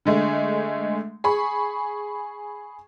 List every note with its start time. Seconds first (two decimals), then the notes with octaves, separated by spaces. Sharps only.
0.05 D3 G#3 A3
1.24 G#4 B5 C#6